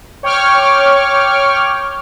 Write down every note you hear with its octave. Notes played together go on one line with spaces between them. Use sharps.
C#5 G5 C#6 D6 F6